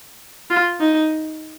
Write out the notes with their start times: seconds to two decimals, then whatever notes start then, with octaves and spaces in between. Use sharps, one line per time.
0.50 F4
0.80 D#4